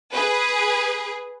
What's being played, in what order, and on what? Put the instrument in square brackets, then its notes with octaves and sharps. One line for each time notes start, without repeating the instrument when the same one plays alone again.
[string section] G#4 B4